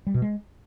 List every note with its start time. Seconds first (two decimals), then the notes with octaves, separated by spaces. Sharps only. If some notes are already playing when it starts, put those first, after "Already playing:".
0.07 G3
0.14 B2
0.22 G#3